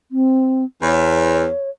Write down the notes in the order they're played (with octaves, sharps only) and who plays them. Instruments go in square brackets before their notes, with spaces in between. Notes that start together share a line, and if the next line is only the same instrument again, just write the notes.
[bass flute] C4
[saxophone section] E2 [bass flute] C#5